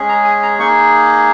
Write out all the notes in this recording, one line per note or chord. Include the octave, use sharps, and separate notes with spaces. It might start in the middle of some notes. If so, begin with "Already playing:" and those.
Already playing: G#3 C#4 G#4
A#5
G#5
A#5
A#3 D#4 G#4 C#6